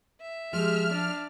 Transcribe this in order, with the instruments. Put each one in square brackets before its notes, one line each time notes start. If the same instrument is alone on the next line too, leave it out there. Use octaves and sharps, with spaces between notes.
[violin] E5
[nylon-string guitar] F3 [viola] G#3 G4 [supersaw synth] F6
[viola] D4 D5